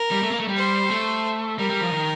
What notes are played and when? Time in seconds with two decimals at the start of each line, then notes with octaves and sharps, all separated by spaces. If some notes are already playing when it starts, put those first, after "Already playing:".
Already playing: A#4
0.11 G3
0.23 A3
0.31 A#3
0.40 A3
0.48 G3
0.56 C5
0.90 A3
1.59 G3 A#4
1.70 G3
1.81 F3
1.92 D#3